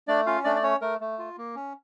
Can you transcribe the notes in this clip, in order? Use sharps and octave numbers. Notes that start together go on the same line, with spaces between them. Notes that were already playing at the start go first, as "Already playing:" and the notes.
A3 D4 D5
C#4 F4 F5
A3 D4 D5
D5
C#4 C#5
A3 A#4
A3
F4
A#3
C#4